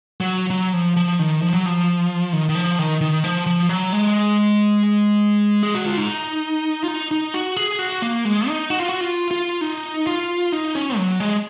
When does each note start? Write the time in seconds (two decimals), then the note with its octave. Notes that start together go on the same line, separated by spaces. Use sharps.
0.21 F#3
0.50 F#3
0.73 F3
0.97 F3
1.19 D#3
1.42 F3
1.54 F#3
1.66 F3
2.33 D#3
2.49 D#3
2.55 F3
2.79 D#3
3.01 D#3
3.24 F3
3.47 F3
3.69 F#3
3.93 G#3
5.63 G#4
5.75 F#4
5.86 F4
5.97 D#4
6.84 F4
6.88 D#4
7.11 D#4
7.34 F#4
7.57 G#4
7.79 F#4
8.02 A#3
8.25 G#3
8.48 D#4
8.70 F#4
8.80 F4
8.89 F#4
9.01 F4
9.31 F4
9.61 D#4
10.07 F4
10.52 D#4
10.75 C#4
10.97 F#3
11.20 G#3